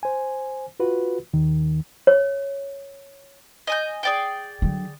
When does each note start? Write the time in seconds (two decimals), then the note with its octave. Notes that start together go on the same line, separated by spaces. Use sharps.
0.03 C5 G#5
0.80 F4 F#4 B4
1.33 D#2 D#3
2.07 C#5
3.67 D#5 G#5 G6
4.03 G#4 D5 G5
4.62 D3 F#3